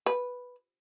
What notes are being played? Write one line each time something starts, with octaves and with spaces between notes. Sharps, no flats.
B4